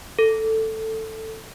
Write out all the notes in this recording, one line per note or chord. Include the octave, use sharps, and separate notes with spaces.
A4